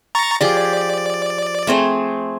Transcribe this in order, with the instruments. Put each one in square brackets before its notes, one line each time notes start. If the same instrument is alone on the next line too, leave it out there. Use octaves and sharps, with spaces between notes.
[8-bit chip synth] A#5 C#6 A6
[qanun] F3 G4 G#4 [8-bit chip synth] D5
[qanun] A3 C4 G#4